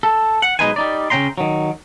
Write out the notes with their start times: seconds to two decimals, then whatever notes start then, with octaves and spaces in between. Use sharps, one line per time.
0.03 A4
0.42 F#5
0.59 B1 G#3 D#4 B4 C5 G#5
0.76 G3 D#4 D5
1.10 C#3 C#4 G5 A#5 C6
1.38 D#3 F#3